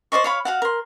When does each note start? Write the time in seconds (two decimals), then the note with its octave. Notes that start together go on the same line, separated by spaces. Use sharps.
0.12 C5 D5 D#5 C#6
0.24 C#5 F5 B5
0.45 F#4 F5 F#5
0.62 A#4 C6